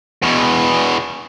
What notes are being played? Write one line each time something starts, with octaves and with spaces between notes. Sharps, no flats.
E2 B2